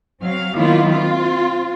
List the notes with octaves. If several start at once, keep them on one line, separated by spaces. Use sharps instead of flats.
F#3 C4 F5
D#3 F#3 A#3 B3 E4 F4
C4 F4